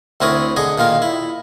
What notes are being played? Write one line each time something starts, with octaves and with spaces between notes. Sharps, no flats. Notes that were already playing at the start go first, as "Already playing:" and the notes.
D2 C4 E4 A#4 C#5 D#6
D3 G#4 D#5 G#5
A#2 D#3 F4 A#4
E4